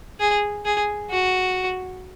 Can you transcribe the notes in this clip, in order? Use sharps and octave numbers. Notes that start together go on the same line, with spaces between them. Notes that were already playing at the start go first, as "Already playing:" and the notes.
G#4
G#4
F#4